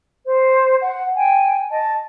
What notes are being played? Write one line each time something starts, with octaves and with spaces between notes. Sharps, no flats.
C5
F#5
G5 G#5
D#5 A5